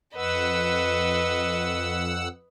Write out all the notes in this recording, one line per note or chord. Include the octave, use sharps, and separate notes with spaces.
F2 B4 D#5 F#5 E6